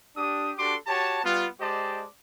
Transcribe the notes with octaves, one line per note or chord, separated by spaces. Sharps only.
D4 G4 D#6
D4 F#4 G4 A4 C6 D6
F#4 G4 C#5 A5
G3 B3 F4
G#3 G4 C5 D5 D#5 A5